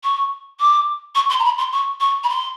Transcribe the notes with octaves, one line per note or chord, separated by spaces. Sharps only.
C#6
D6
C#6
C6
A#5
B5
C6
C#6
C#6
B5
C6